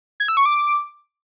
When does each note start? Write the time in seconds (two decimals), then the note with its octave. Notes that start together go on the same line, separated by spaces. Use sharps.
0.20 G#6
0.28 E6
0.37 C#6
0.46 D6